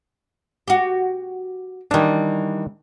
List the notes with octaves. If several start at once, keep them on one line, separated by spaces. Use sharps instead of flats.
F#4 G4
D#3 E3 G3 D4